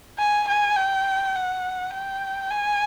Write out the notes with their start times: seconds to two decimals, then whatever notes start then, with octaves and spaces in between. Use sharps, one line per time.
0.19 G#5
0.48 G#5
0.76 G5
1.35 F#5
1.93 G5
2.51 G#5